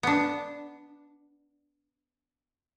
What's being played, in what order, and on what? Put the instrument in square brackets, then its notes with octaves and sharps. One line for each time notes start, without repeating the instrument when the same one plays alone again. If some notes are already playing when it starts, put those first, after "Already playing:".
[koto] B3 D4